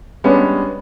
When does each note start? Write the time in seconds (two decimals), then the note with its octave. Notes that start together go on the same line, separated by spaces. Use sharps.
0.24 G3 G#3 B3 C#4 D4